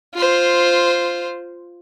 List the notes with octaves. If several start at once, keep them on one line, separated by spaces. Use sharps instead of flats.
F4 C5